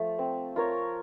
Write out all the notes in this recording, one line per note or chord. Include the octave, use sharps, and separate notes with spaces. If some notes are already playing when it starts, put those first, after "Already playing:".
Already playing: F3 A3
C4
F4 A#4 C#5